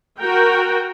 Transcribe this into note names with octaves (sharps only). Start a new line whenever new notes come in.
F#4 A#4 G5